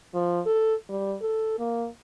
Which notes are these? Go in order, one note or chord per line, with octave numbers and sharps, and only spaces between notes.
F3
A4
G3
A4
A#3